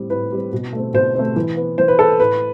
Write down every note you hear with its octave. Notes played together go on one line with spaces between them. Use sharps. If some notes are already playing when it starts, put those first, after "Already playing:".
Already playing: A2 G3 C4
A2 B4
G3 C4
B2
A3 C4
B2 C5
A3 C4
E3
B3
E3 C5
B4
B3 A4
A2 B4